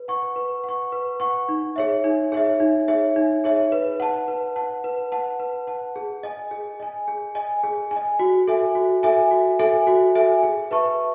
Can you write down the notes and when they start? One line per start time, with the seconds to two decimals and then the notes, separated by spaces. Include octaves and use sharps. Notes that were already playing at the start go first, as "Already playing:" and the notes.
Already playing: B4
0.08 F#5 C#6
0.36 B4
0.64 F#5 C#6
0.92 B4
1.20 F#5 C#6
1.49 D#4
1.76 G#4 C#5 E5
2.04 D#4
2.32 G#4 C#5 E5
2.60 D#4
2.88 G#4 C#5 E5
3.16 D#4
3.44 G#4 C#5 E5
3.72 B4
4.00 F#5 A5
4.28 B4
4.56 F#5 A5
4.84 B4
5.12 F#5 A5
5.40 B4
5.67 F#5 A5
5.96 G#4
6.23 D#5 G#5
6.51 G#4
6.80 D#5 G#5
7.08 G#4
7.35 D#5 G#5
7.64 G#4
7.91 G#5
7.96 D#5
8.19 F#4
8.48 A4 E5 G#5
8.75 F#4
9.03 A4 E5 G#5
9.31 F#4
9.59 A4 E5 G#5
9.87 F#4
10.15 A4 E5 G#5
10.43 G#4
10.71 B4 E5 A5 C#6